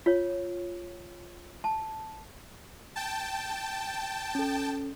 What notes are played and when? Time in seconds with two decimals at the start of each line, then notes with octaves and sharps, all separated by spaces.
0.06 F4 C#5
1.64 A5
2.96 G5 A5
4.35 C#4 A4